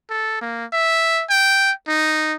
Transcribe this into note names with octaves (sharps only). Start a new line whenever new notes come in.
A4
A#3
E5
G5
D#4